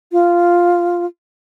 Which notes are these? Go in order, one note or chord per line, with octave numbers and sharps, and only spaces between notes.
F4